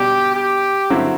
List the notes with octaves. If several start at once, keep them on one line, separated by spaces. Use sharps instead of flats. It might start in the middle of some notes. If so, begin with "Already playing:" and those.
Already playing: B2 G3 D4 G4
G4
G2 D3 F#3 C4 E4